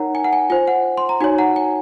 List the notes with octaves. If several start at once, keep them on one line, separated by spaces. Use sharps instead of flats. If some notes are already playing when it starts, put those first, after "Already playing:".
Already playing: D#4 A#4 C#5 F#5 A#5
G#5
F#5
G#5
F4 C5 G#5
F#5
C6
A#5
D#4 F#4 C#5 G#5
F#5 A#5
G#5